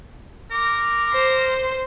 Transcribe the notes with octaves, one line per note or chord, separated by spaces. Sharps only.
A#4 D6
C5